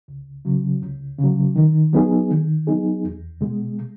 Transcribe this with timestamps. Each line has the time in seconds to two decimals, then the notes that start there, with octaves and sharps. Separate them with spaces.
0.08 C#2
0.45 C#3 F#3
0.82 C#2
1.19 C#3
1.24 F#3
1.56 D#3
1.93 F#3 B3 D#4 G#4
2.31 D#3
2.67 F#3 B3 D#4 G#4
3.04 E2
3.41 B2 G#3